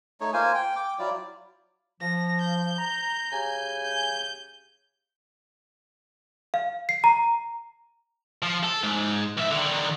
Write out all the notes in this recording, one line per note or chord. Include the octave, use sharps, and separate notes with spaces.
A3 D#4 C#5
A#3 F4 C5 G#5
G5
G5 D6
F#3 E4 F4 D5
F3 A#6
G6
A#5
C#3 G4 G#5
G6
F5
C7
A#5
F3
A4
G#2
B1 E5
D3 D#3